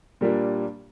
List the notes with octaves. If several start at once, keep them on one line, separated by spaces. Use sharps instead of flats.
A#2 G3 A#3 D4